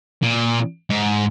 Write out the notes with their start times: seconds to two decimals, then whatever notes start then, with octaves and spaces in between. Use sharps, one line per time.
0.22 A#2
0.90 G#2